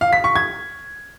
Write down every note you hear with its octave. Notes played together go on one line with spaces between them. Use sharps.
F5
B6
C#6
G#6